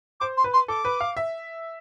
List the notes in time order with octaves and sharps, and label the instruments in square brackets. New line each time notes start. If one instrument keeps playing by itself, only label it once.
[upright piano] C5 [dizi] D6
[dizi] C6
[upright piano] B4
[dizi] C6
[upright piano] A4 [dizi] D6
[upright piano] B4
F5
E5